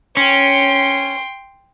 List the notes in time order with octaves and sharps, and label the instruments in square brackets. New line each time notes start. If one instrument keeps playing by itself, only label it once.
[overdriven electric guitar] C#4 [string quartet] G5 C6